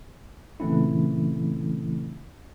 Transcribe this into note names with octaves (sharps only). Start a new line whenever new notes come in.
A#2 C#3 E3 A3 C4 E4